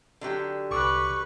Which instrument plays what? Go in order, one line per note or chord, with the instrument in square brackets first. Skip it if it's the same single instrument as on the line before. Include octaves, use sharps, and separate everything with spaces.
[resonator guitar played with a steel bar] D3 F#3 G4
[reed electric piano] C2 D6 [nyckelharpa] B4 [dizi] C#6